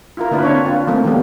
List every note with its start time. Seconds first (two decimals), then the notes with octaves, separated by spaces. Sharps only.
0.17 E4 F4 A#4
0.31 D3 A#3 D4 E4 F4 B4
0.43 D3 C4 D4 C#5
0.65 D4 F4 B4
0.87 F3 A3 A#3 C4 D#4 F4
1.04 D#3 E3 G3 A#3 B3 G4